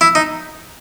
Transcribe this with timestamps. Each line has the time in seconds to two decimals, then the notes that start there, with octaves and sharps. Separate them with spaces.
0.01 E4
0.15 D#4